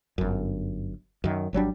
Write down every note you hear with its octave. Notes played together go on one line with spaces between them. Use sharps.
G1 F#2
F#2 D#3
G#1 F#3 G3 D4